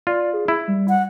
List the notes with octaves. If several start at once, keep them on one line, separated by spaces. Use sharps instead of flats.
F4 D5
G#4
E4
G3
F#5